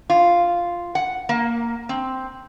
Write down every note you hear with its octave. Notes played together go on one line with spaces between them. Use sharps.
F4
F#5
A#3
C4